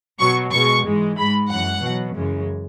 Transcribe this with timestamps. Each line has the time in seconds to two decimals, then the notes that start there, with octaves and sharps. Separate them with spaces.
0.19 B2 F#3 C#6
0.52 B2 G#3 C#6
0.85 G#2 E3 G#3
1.17 G#2 G#3 B5
1.50 F#2 E3 G#3 F#5
1.82 B2 F#3
2.15 F#2 C#3 E3 G#3